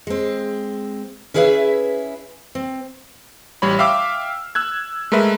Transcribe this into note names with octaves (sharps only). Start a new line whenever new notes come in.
G#3 C4
C#4 E4 G#4 B4 C5 E5
C4
A1 G3 C#5 B5
E5 F5 G5 D6 E6 F6
E6 F#6 G#6
G#3 A3 A#4 B4 E5